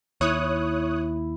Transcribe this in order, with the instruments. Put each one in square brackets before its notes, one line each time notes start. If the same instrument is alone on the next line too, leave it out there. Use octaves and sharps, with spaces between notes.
[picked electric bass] D#2 [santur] E4 [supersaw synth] C#5 D#6 F#6